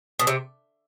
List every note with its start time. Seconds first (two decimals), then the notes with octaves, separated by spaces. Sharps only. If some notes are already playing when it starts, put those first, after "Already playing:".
0.19 B2
0.27 C3